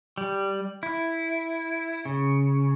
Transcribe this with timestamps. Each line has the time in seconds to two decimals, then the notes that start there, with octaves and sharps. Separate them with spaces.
0.18 G3
0.83 E4
2.05 C#3